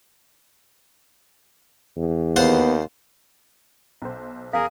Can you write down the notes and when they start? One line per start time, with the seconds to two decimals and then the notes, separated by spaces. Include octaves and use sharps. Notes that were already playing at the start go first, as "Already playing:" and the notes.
1.96 E2
2.36 D#2 B3 F4 C5 F#5
4.02 B1 C5
4.53 E2 G#4 A#4 F5 G#5